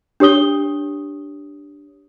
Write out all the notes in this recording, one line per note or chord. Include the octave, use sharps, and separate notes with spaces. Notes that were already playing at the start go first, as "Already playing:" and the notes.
D4 G4 C#5 D#6 G7